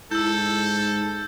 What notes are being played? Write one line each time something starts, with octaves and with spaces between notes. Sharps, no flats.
G#2 E4 A4 E6 G6